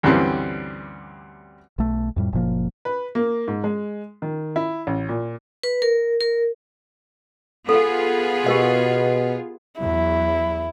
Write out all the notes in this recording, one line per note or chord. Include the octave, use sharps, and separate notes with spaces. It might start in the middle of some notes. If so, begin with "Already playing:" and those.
D2 G2 E3 G3 C4 C#4
B1 A3
F2 A2 G3
F#1 A#2 F3 A#3
B4
A#3
G#2
G#3
D#3
E4
A1
A#2
B4
A#4
A#4
B3 F4 G#4 A4
B2 G4 A#4 D#5
E2 F#3 E4